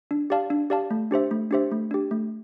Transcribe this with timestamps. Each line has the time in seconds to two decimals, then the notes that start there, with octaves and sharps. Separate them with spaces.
0.11 D4
0.30 G4 D5 F5 A5
0.50 D4
0.70 G4 D5 F5 A5
0.91 A3
1.11 D4 G4 C5 E5
1.31 A3
1.51 D4 G4 C5 E5
1.71 A3
1.91 D4 G4
2.11 A3